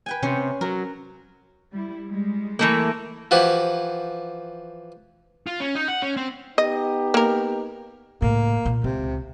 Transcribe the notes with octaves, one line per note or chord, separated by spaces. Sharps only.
B4 G5 G#5
C3 C#4 C5
F#3 A#4
G3 E4
G3 G#3
E3 A3 A#3
E3 F3 F#4 G4
F4
C#4
D#4
F#5
C#4
C4
B3 D#4 G4 D#5
A#3 A#4
A2 C#3 A#3
A#2
C#2 C3